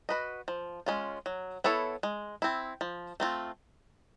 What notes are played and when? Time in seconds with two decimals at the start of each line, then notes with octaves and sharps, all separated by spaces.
0.09 F#4 B4 D#5
0.48 F3
0.86 G#3 C#4 F4
1.26 F#3
1.64 B3 E4 A4 C#5
2.03 G#3
2.42 C4 E4
2.81 F3
3.20 A3 C4 F4